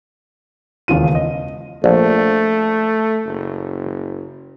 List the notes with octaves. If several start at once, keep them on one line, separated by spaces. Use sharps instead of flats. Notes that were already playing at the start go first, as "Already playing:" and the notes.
E1 D#2 C#3 F4 D#7
D#5
A#1 A3
F#1